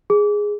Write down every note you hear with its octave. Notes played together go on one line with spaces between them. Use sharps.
G#4